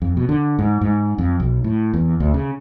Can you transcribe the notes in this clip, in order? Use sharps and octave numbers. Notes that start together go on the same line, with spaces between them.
F2
B2
D3
G#2
G#2
F2
B1
A2
E2
D2
C#3